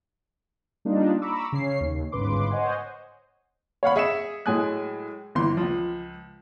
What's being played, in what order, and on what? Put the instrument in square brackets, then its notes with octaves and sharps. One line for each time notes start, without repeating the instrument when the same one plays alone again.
[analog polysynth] G3 A#3 D4 D#4 F4
A#5 B5 C#6 D6 E6
C#3 C#4 C#5 C7
D#2
G1 G#2 C#3 B4 C6 D6
C5 C#5 D#5 F#5 G#5
[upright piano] C#5 F5 F#5 B5
G#4 E5 C#7 E7
A2 F#3 G#3 G#5 D#6 F#6
G1 E3 C6
C#2 F3